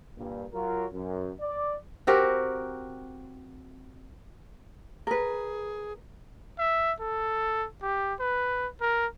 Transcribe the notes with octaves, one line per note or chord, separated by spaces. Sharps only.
G2 A#2 A#3
F#3 F4 A#4
F#2
D5
C4 F#4 G4 A#4
G#4 A#4 B4
E5
A4
G4
B4
A#4